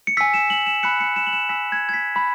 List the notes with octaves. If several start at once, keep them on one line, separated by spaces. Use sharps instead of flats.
C#7
G#5 E6 B6
E7
F#7
E7
B5 F#6 C#7
C#7
E7
F#7
E7
G#5 B5 E6 B6
G#6
G#6
B6
B5 B6